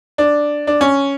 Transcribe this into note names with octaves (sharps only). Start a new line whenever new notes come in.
D4
D4
C#4